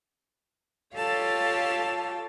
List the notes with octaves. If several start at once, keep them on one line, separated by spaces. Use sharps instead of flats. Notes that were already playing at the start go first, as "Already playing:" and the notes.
F4 G4 A4 C#5 F5 A5